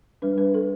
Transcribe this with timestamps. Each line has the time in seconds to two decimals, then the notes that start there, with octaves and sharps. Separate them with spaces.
0.22 G3 D4 B4
0.38 B4
0.54 A4